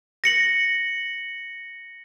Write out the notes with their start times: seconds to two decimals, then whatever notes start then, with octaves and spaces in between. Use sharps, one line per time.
0.24 A#6 C#7 F#7